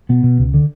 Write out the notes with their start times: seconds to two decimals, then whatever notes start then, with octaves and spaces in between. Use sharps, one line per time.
0.09 B2 B3
0.23 B2
0.38 C#2
0.54 D3